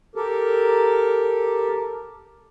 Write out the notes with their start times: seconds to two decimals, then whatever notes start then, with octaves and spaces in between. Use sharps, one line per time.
0.16 G4 A4 A#4